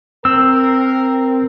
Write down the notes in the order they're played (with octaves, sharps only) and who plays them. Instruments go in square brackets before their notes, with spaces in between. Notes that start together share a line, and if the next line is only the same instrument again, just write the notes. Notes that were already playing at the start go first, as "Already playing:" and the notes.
[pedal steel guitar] C4 [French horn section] A#4 [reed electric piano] E6